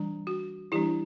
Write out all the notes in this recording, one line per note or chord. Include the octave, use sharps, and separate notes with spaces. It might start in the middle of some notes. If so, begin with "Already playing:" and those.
Already playing: E3 G3 D4
F#4
E3 G3 D4 E4 G4